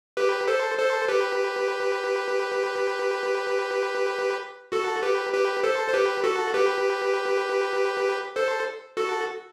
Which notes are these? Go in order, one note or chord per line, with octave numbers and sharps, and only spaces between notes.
G4 B4
A4 C5
A4 C5
G4 B4
F#4 A4
G4 B4
G4 B4
A4 C5
C5
G4 B4
F#4 A4
G4 B4
A4 C5
F#4 A4